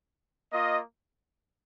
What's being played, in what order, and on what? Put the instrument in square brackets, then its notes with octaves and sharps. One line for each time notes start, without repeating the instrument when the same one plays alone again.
[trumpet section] A#3 F4 D#5